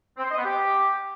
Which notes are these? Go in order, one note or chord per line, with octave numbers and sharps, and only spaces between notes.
C4
C5
D#5
B3
G4